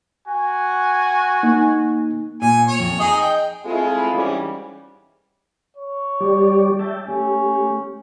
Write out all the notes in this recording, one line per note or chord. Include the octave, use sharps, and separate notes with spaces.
F#4 G#5
A#3 D#4
A#2 G#5
C#5
F2
D#4 G#4 D#5 D#6
G5
G#3 A3 C4 E4 F4 G#4
E2 G#2 E3 G3 C#4
C#5
G3 G4 D5
E5 G5 A5
A3 C#4 G4